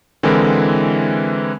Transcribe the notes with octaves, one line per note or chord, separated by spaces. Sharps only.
D3 E3 G#3 C4 E4 A#4